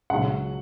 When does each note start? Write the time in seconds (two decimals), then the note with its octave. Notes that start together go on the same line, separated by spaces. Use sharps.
0.10 C#2 C#3 F#3 F#5